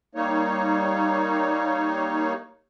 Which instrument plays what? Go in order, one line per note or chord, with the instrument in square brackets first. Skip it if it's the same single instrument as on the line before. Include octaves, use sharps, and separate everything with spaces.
[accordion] G3 A#3 D#4 C#5